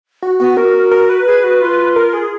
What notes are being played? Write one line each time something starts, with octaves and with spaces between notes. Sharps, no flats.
F#4
B3 F#4
F#4 A#4
A#4
B4
G#4
F#4
F4
A#4
G#4